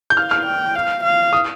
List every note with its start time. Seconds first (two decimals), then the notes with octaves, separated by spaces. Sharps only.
0.10 G6
0.17 F5 F6
0.31 F6
0.46 G5
0.75 F5
1.04 F5
1.33 D#6